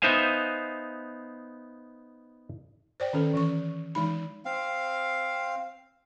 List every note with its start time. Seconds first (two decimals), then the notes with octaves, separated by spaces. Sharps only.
0.02 B3 D#4 C5 E5 F5 G#5
3.00 C5 D5 G5
3.13 D#3 C#4 A4
3.34 E3 C#4 C#6
3.95 E3 G#3 D#4 B5
4.45 C4 F5